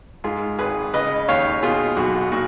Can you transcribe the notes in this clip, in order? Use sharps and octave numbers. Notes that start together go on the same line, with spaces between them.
G#2 F4 G#4
G#1 G#4 B4
C#3 B4 D#5
D#2 C#5 F5
B2 F4 G#4
B1 F#4
A#2 F#4